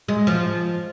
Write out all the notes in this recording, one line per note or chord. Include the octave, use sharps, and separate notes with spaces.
G#3
F3